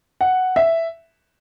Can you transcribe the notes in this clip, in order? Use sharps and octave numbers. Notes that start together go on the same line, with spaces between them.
F#5
E5